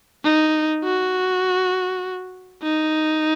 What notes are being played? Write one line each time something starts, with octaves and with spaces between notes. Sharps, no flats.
D#4
F#4
D#4